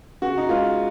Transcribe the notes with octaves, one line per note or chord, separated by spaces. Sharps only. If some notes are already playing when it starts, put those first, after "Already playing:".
C#3 F#4
D#4
G#3 F4